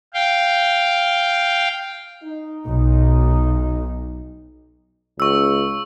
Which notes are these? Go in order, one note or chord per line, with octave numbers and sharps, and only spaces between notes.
F5 G5
D#4
B1
C#2 C#6 E6